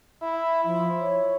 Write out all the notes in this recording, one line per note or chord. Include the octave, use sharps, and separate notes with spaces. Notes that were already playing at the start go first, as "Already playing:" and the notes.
E4
F3 E4
C#5